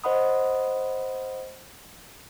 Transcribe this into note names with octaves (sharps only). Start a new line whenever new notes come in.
C5 D#5 F#5 B5 D#6